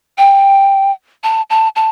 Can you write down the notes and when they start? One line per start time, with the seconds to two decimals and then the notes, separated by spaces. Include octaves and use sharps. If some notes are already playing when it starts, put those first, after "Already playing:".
0.18 G5
1.23 A5
1.50 A5
1.76 A5